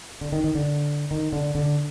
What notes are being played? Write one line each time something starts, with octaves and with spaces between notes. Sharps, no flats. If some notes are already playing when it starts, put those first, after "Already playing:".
D3
D#3
D#3
D3
D#3
D3
D3